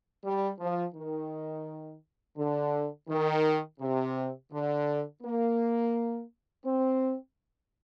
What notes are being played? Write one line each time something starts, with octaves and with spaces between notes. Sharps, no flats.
G3
F3
D#3
D3
D#3
C3
D3
A#3
C4